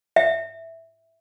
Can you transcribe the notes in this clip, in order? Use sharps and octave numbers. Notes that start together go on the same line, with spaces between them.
E5